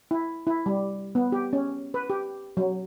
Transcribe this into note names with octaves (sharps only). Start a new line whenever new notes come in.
E4
E4
G3
B3
G4
C#4
B4
G4
F#3